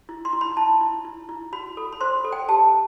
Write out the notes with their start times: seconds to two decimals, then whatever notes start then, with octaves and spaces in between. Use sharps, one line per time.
0.09 E4
0.25 C6
0.33 E4
0.41 B5
0.57 E4 A5
0.81 E4
1.05 E4
1.29 E4
1.53 F#4 B5
1.77 A4
1.93 B5
2.01 C5 C6
2.24 A4
2.32 G5
2.49 G4 A5